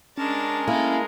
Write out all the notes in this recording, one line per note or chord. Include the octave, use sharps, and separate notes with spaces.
G#3 C#4 D4 A#4 A5
A#3 E4 G#4 A4